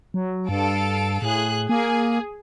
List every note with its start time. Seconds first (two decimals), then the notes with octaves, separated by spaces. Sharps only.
0.14 F#3
0.49 G2 A4 F5 D7
1.22 A2 G#4 F#6
1.69 A#3 G#4